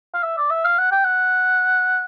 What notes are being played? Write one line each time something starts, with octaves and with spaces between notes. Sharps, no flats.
F5
E5
D5
E5
F5
F#5
G5
F#5